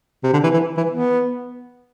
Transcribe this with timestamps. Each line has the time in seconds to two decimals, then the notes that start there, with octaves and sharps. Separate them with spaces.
0.23 C3
0.33 D3
0.43 E3
0.53 E3
0.77 E3
0.91 B3